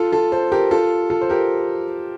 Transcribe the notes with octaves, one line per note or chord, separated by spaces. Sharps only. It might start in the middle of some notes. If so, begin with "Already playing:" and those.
Already playing: F4 A4
F4 A4
A4 C5
G4 A#4
F4 A4
F4 A4
C5
G4 A#4